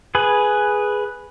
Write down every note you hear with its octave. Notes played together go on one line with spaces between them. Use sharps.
G#4 B4